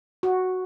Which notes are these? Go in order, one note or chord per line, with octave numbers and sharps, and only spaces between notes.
F#4